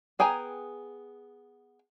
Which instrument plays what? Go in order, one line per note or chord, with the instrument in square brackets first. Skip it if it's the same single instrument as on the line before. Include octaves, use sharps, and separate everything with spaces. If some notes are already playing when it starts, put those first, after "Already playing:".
[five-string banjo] B3 G#4 G5 G#5 A#5